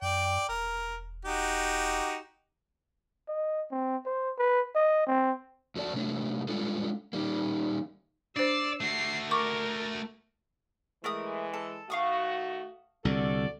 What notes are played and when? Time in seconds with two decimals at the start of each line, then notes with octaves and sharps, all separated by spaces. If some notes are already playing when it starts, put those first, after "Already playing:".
0.02 F#2 D5 G5
0.49 E1 A#4
1.25 D#4 F#4 G4
3.28 D#5
3.72 C4
4.06 C5
4.38 B4
4.75 D#5
5.06 C4
5.75 F2 F#4 A4 D5 A5
5.93 C3 F#3 A3 D4
6.48 G3 G#3 D4 F4 A4
7.13 D#3 G3 A#3
8.36 D4 C5 D5 E6 C7
8.81 A3 F#4 C7
9.31 A#4 C#6 D6
11.04 E3 G#3 A3 A#4 D#6
11.53 A4
11.90 D#3 A3 F#4 F5 C#6 D#6
13.05 C2 D3 F#4 A4 D5